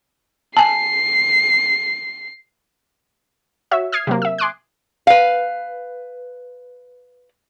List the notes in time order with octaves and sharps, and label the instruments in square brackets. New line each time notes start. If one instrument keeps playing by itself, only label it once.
[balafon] G#5 A5 [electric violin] C7
[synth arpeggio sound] F#4 C#5 E5
D#6 F6 G#6 C7
C3 F#3 A#3
E5 E6
G#5 C6 D6 D#6 F#6
[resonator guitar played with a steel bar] B4 F5